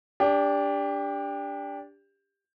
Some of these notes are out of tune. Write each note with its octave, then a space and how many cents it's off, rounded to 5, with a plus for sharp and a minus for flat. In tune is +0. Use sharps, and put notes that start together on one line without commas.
D4 -15 G4 +20